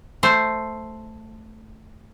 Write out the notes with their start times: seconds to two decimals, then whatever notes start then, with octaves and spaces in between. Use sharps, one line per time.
0.23 A3 C5